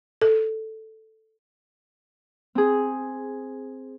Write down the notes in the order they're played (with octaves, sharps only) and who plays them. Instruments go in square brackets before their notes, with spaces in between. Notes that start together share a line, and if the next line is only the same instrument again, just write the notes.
[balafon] A4
[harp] C4 G#4